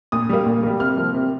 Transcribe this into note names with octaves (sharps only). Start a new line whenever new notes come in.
A#2 D#6
G3 A#3
A#2
G3 A#3
C3 F6
F3 A#3
C3